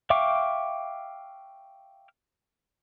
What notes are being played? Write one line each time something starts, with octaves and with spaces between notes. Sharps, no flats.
E5 F5 G5 C#6 D6